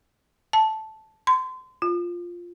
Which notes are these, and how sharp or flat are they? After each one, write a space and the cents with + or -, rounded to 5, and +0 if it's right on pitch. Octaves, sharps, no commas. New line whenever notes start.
A5 -5
C6 -30
F4 +0